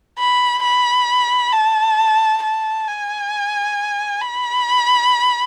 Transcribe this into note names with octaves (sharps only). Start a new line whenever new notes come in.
B5
B5
A5
A5
G#5
B5